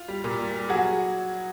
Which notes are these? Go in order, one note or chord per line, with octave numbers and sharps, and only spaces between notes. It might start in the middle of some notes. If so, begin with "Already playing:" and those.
Already playing: F4
G3
A#2
G3
G3
F#3 F#4 G#4